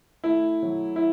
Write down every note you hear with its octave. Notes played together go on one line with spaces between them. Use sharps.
A3 E4
F#3
E4